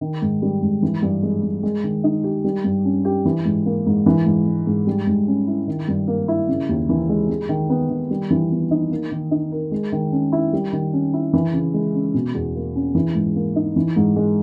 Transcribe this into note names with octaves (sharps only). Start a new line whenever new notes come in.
D#3
G#2
G3
G#2
E3
G2
G#3
G2
G#3
D#3
D#4
G4
G3
G2
C#4
G4
E3
G#2
A#3
G#2
E3
G#2
G#3
G#2
G3
G#2
C#4
E4
D#3
G2
A#3
E4
C#3
D#2
E3
G#3
G#3
D#3
B3
D#3
G3
E3
B3
D#4
A#3
D#3
D#4
A#4
G#3
D#3
C#4
E4
G3
D#3
C#4
E4
E3
C#3
G#3
C#4
B2
E2
A#3
C#4
E3
G#2
A#3
D#4
E3
G#2
G#3